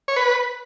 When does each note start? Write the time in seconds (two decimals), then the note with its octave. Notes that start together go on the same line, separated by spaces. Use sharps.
0.08 C#5
0.16 B4